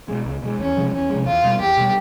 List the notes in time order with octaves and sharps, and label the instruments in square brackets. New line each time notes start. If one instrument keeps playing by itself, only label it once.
[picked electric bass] B2 G#3
C#2
B2 G#3
[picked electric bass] E2 [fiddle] C#4
[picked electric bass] C3 F3 G#3
[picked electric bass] E2 [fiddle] C#4
[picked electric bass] C3 F3 G#3
[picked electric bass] E2 [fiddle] F4
[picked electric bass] B2 G3 B3
[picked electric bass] E2 [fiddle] G4
[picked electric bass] B2 G3 B3